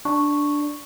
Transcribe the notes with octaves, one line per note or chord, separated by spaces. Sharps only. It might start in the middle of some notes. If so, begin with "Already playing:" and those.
D4 C#6